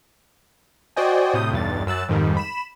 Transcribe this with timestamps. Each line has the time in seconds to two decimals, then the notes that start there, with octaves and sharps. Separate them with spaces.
0.96 F#4 C5 D5 D#5 G5 G#5
1.34 A2 C3 D#6 G6
1.51 B1 E2 G2 A6
1.87 F#2 E6 F#6 A6
2.08 F2 G#2 D#3 G3
2.37 B5 E7